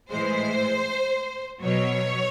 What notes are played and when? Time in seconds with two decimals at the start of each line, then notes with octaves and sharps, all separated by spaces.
0.11 A2 E3 G#3 C5
1.62 B2 F#3 C#5